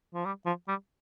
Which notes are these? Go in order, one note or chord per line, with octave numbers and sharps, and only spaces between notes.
F3
G3
F3
G3